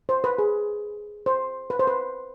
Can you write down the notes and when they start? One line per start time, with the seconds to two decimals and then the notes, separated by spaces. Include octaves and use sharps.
0.09 C5
0.24 B4
0.38 G#4
1.26 C5
1.70 B4
1.79 C5
1.87 B4